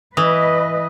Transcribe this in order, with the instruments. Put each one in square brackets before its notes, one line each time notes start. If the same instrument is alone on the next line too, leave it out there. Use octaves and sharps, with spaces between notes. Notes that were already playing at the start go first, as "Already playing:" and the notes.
[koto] E3 [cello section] B4 D#5 [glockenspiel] D#6